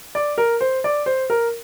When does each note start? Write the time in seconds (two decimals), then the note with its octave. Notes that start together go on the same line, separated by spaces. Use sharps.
0.15 D5
0.38 A#4
0.61 C5
0.84 D5
1.06 C5
1.30 A#4